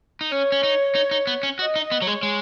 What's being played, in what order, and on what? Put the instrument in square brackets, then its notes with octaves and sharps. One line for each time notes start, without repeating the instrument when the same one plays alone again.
[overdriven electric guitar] D#4
[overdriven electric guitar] C#4 [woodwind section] C#5
[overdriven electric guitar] C#4
D#4
D#4
D#4
B3
C#4
[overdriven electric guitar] F#4 [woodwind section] D#5
[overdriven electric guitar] D#4
[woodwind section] D#5
[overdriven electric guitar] B3
[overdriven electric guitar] F#3 [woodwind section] C#5
[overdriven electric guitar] G#3
[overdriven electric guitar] G#3 [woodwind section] C#5